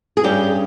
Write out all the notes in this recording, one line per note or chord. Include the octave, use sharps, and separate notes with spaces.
G#4
G2 G3 C#4 G4